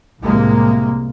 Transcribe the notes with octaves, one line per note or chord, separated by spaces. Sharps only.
C2 A2 C3 G#3 A#3